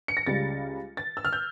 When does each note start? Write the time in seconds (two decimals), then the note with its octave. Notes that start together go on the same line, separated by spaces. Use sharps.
0.08 C#7
0.17 A#6
0.26 C#2 C#3 G3 A6
0.97 A6
1.17 E6
1.25 F6
1.33 G6